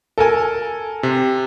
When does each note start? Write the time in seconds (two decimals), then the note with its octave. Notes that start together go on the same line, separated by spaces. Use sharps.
0.18 A4 A#4 G#5
1.03 C3